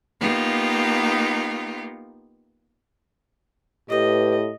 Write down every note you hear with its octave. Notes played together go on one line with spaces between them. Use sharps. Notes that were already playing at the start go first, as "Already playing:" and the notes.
A#3 B3 D#4 F4 G4
A2 G#3 G4 B4 D#5